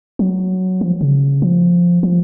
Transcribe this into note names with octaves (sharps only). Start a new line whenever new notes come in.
F#3
F3
C#3
F3
F3